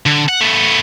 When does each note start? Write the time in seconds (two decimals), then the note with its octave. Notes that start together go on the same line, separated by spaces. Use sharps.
0.06 D3
0.29 F#5
0.41 A3 B3